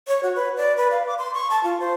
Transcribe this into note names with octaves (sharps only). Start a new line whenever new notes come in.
C#5
F#4
B4
D5
B4
F5
D6
C6
C#6
A5
F4
C5